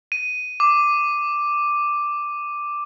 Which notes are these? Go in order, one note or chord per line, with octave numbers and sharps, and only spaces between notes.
D#7
D6